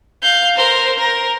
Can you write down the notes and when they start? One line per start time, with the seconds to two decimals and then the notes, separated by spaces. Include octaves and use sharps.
0.23 F5 G6
0.56 A#4 C5
0.99 A#4